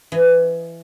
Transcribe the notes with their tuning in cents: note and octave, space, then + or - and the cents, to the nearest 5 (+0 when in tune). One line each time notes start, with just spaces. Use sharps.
E3 +20 D#5 +0